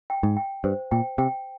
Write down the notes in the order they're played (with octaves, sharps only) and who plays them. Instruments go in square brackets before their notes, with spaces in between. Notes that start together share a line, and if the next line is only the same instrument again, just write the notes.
[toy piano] G5
[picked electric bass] G#2
[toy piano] G5
[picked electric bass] G2 [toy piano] C5
[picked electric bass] A#2 [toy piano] G5
[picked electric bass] C3 [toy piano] G5